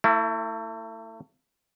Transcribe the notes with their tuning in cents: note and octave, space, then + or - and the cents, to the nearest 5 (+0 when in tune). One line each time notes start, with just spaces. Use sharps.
A3 +35 E4 +0